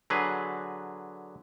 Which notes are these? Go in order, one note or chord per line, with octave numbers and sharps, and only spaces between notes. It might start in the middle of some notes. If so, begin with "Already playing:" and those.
D3 F#3 G#4 B4